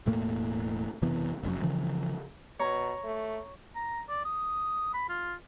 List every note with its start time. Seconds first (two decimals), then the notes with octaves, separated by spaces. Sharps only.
0.06 E1 A2 A3 A#3
1.02 F#1 C3 E3 B3
1.43 F1 F#2
1.62 C#3 E3 F3
2.59 B2 C#5 A#5
3.04 A3
3.76 A#5
4.09 D5
4.25 D#6
4.94 B5
5.09 F4